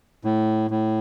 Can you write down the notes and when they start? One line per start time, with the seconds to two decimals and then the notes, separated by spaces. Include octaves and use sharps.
0.25 A2
0.71 A2